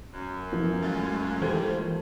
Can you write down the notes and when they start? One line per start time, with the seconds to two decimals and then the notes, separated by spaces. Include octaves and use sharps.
0.14 F#2
0.52 E3 F3
0.83 G#3 A3 F4 G#6 A6
1.42 A#2 D#3 E3 G3 A4 C5 G#6